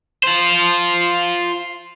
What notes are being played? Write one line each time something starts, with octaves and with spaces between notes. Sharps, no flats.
F4 C5